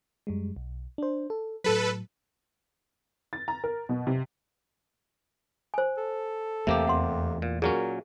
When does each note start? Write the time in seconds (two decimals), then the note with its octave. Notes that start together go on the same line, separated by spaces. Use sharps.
0.27 F#2 G3 G#3
0.56 B1
0.98 D4 C5
1.30 A4
1.64 A2 F#3 A4 B4
3.33 A6
3.48 A#5
3.64 A#4
3.89 B2
4.07 C3
5.74 C5 G#5
5.97 A4
6.67 E2 C3 A3 A#3 G4
6.87 F2 F#5 C6
7.42 A#2
7.62 A#2 F#3 C#4 G#4 A#4